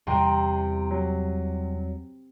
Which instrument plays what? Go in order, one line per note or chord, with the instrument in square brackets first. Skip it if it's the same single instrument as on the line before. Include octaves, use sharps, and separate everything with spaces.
[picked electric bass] E2 E3 G3 [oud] C3 [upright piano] G5 A#5 C6
[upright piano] F#3